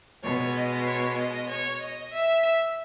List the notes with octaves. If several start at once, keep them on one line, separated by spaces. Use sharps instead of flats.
B2 G#3 C#5
D#5
C#5
D#5
C#5
D#5
E5